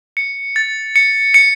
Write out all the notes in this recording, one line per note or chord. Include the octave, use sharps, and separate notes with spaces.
C#7
A6
C#7
C#7